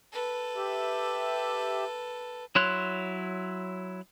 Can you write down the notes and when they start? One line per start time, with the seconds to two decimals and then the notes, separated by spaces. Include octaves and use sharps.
0.12 A4 B4
0.56 G4 E5
2.55 F#3 E4 C#5 C6 F#6